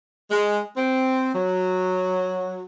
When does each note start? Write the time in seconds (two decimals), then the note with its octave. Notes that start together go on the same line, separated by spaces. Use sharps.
0.31 G#3
0.77 C4
1.35 F#3